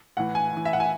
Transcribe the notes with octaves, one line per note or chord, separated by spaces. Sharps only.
A2 E3 F#5
G#5
A2 E3
E5
F#5
G#5